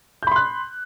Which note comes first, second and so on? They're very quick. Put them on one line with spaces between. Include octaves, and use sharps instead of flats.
G6 B5 C6 F#6